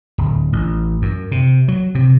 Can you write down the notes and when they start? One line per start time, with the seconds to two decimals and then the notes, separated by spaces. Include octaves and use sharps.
0.18 D1
0.53 A1
1.02 F#2
1.32 C3
1.68 F#3
1.95 C3